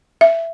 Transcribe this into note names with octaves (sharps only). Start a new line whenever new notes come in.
E5